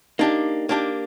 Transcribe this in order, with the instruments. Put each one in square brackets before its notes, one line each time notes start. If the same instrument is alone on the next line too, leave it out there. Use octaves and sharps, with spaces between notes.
[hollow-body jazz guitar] A#3 D4 G4 [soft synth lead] D#4
[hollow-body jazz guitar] A#3 D4 G4